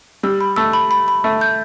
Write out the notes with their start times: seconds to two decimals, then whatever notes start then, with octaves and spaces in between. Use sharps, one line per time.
0.23 G3 E6
0.41 B5
0.56 A3 E6
0.73 B5
0.91 B5
1.08 B5
1.24 A3 E5
1.41 G6